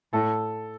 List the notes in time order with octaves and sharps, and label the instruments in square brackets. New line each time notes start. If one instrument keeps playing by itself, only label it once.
[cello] A2 [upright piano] A4